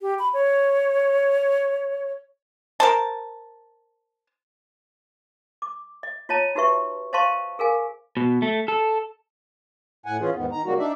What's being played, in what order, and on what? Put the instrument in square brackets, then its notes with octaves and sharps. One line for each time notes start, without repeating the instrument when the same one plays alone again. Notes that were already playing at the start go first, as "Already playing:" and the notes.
[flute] G4
B5
C#5
[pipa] A#4 C5 A5
[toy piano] D6
D#5
F4 C#5 D#5 A5 A#5
D#4 F#4 G4 B4 E5 C#6
C5 D#5 F5 A5 C6 C#6
G#4 A#4 F5 G#5
[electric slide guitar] B2
A3
A4
[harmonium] A2 F#5 G#5
E3 C#4 F4 G#4
E2 G#2 D#3 B3
D#3 A#5
C#3 G3 A#3 F#4
D4 D#4 D5 E5